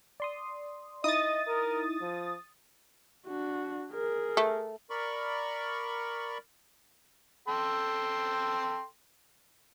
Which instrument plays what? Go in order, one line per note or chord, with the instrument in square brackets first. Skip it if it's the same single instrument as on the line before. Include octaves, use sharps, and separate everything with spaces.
[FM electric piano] D5 C6 D#6
[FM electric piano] D#4 E4 [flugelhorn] D#5 [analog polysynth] D#6 A6
[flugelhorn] A#4
F3
[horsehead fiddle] D4 F#4
G#4 A#4
[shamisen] A3
[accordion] A#4 D5 B5 C#6
[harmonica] A4 G5 C6